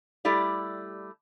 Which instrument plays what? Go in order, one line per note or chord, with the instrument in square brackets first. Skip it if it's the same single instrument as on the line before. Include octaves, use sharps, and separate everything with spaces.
[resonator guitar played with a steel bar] G3 A3 E4 G4 D5